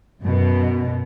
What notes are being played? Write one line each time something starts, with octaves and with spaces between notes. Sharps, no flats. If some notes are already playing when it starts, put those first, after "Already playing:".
F#2 B2